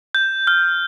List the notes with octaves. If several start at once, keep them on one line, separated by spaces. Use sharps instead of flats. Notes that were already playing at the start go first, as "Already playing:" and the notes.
G6
F6